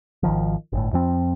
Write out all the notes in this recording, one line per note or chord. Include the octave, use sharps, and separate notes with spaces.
G#1 D#3 F3
G1 A2
F2 F3 C4